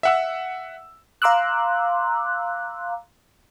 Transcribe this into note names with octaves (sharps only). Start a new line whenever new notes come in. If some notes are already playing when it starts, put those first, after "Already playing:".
E5 F#5 E6
F5 A#5 C6 D6 E6 F#6